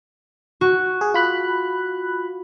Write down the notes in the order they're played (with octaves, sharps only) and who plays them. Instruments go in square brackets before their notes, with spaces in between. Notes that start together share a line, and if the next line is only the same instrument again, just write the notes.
[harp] F#4
[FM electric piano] G#4
F4 B5 F#6